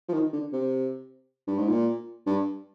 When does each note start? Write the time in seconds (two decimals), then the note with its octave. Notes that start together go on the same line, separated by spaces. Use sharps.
0.09 F3
0.13 D#3
0.33 D3
0.53 C3
1.47 G2
1.58 G#2
1.69 A#2
2.26 G2